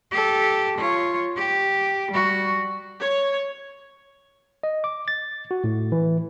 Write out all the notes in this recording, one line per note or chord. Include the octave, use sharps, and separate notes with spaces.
G4 A4
F4 C#5
G4
G3 F#4
C#5
D#5
D6
A6
F#4
A2
E3